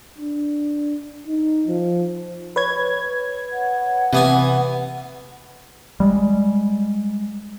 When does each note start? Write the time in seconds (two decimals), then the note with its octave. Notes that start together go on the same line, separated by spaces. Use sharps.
0.18 D4
1.28 D#4
1.67 F3
2.56 B4 C#5 G#6
3.53 F#5
4.13 C3 E3 B3 G#5
6.00 G3 G#3